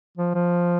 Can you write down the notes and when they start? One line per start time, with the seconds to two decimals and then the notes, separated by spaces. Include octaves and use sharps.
0.17 F3
0.34 F3